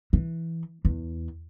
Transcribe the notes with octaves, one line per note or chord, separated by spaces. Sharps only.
E3
E2